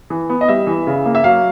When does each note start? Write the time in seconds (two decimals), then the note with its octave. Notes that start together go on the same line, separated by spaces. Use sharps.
0.10 E3
0.29 B3
0.41 D#5
0.49 G3 E5
0.67 E3
0.87 C#3
1.06 A#3
1.15 E5
1.24 F#3 F5